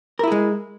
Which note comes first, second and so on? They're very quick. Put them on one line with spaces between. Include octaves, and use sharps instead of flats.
A#4 E4 G#4 G#3